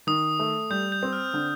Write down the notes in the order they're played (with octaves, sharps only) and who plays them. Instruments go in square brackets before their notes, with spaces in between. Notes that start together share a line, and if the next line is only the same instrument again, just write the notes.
[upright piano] D#3 [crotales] D#6
[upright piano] A3
[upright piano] G3 [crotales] G6
[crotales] G6
[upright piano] C4
[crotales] F6
[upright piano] D3